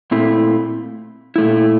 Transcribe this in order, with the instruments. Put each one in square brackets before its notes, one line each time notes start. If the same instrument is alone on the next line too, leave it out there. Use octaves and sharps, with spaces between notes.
[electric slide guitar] A#2 A3 C4 E4
A#2 A3 E4